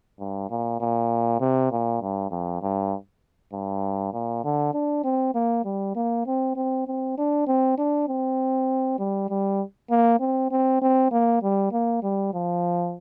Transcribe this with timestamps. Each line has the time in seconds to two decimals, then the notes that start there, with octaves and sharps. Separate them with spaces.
0.19 G2
0.50 A#2
0.80 A#2
1.40 C3
1.71 A#2
2.02 G2
2.31 F2
2.62 G2
3.53 G2
4.13 A#2
4.44 D3
4.74 D4
5.04 C4
5.34 A#3
5.65 G3
5.96 A#3
6.26 C4
6.56 C4
6.87 C4
7.18 D4
7.47 C4
7.78 D4
8.08 C4
8.99 G3
9.30 G3
9.90 A#3
10.20 C4
10.51 C4
10.82 C4
11.11 A#3
11.42 G3
11.72 A#3
12.03 G3
12.33 F3